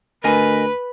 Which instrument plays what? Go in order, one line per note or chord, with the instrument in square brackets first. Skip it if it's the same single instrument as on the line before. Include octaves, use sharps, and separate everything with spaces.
[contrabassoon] D2 [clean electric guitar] A#4 D#5 G#5 [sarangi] B4